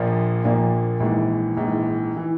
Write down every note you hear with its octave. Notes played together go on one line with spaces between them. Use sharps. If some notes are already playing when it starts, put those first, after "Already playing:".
Already playing: A#1 A#2 F3 A#3 D4
A#1 A#2 F3 A#3 D4
A#1 G#2 E3
A#1 G#2 E3
E3